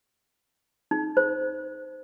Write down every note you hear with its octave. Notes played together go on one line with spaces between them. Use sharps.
D#4
C5